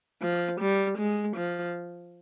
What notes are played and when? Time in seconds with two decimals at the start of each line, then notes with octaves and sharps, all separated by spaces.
0.22 F3
0.60 G3
0.98 G#3
1.36 F3